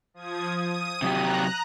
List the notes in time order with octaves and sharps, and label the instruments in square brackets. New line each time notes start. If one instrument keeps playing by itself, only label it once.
[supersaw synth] F3 D#6 G#6
D#6 D#7
[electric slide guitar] C3 F#3 G4 [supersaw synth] A#5 F#6